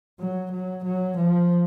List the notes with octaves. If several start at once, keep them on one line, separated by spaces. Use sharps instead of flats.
F#3
F#3
F#3
F3